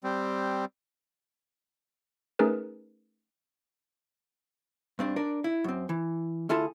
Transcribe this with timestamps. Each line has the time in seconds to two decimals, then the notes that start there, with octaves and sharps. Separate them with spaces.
0.04 G3 C4
2.39 A3 C#4 D#4 G#4 A#4 B4
4.99 G2 C4 D4
5.16 D4 A#4 D5
5.44 E4
5.64 F#2 C4
5.89 E3
6.49 D2 E4 F4 G#4 A4 A5